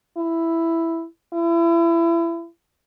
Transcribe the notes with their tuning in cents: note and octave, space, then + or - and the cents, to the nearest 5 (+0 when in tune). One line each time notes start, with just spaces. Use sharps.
E4 +5
E4 +30